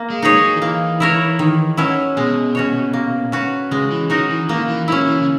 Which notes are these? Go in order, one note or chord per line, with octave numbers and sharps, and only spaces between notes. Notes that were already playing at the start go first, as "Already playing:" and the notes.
Already playing: A#3
G#3
D#4 G#4 C#5
F#3
D#3
E3 A#3
E4 A#4 C#5
D#3
F#3 C#4 E4
B2 G#3
C#4 F#4 C#5
A#3
C#4 F#4 B4
C#3 G#3
E3
F#3 D#4 F#4 A#4
E3
D#3 A#3
E3
F#3 C#4 E4
E3
C#3